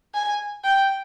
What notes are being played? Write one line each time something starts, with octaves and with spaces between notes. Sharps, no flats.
G#5
G5